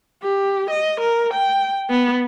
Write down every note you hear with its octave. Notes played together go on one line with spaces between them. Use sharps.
G4
D#5
A#4
G5
B3